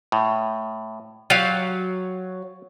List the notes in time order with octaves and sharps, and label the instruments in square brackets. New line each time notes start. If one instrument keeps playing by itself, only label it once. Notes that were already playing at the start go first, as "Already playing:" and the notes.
[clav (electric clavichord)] A2
[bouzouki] F#3 [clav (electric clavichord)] F4 G4 F5